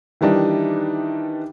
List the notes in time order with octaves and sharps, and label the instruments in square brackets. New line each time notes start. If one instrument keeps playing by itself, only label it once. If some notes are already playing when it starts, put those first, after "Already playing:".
[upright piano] D#3 E3 G3 D4 D#4